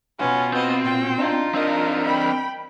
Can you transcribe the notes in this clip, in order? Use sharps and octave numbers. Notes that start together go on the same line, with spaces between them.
B2 B3 C#4 F4 F#4
B3 C4 D#5 G5
A#2 G5
D4 D#4 F4
C4 D4 A#4 D#5
G5 B5